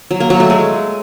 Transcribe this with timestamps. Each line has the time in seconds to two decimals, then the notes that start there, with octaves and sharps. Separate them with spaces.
0.11 F#3
0.20 A#3
0.30 F#3
0.40 A3
0.50 G#3